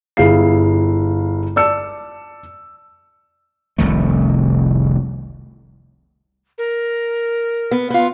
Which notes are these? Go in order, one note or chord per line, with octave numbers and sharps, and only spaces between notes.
G1 E4 G#4 F5 C7
D5 A5 E6 C#7
F1 C2 D#3 A3
A#4
B3
B3 F4